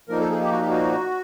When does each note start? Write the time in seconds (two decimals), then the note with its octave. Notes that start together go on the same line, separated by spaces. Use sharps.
0.08 A#2 F3 A#3 D#4 A#4
0.19 A4
0.30 G#4
0.41 G4
0.52 F#4
0.61 G4
0.70 F#4